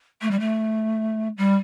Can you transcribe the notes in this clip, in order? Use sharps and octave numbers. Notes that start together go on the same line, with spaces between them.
A3
G3
A3
G3